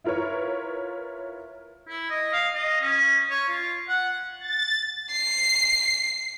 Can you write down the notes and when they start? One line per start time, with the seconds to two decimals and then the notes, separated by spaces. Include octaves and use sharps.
0.04 E4 F4 A#4 B4 C#5
1.89 E4
2.10 D#5
2.33 F5
2.54 D#5
2.81 C#4
3.30 C#5
3.49 F4
3.89 F#5
4.40 A6
5.12 C7